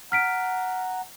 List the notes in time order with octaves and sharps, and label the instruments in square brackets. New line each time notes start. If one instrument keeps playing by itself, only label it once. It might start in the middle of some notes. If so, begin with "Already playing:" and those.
[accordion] F#5 A#5 [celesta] F6 B6 D7